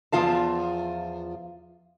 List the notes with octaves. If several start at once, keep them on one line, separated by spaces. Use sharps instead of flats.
E2 F3 F4 F5 A5